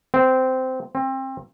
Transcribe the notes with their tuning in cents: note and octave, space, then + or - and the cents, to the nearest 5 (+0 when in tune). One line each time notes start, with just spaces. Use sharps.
C4 -15
C4 +25